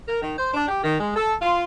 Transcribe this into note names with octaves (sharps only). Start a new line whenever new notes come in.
A#4
D#3
C5
D4
G4
D#3
G#3
A4
F4